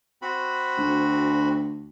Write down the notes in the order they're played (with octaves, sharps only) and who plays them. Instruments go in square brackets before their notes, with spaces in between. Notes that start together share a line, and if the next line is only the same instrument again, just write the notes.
[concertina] C4 F#4 B5
[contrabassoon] D2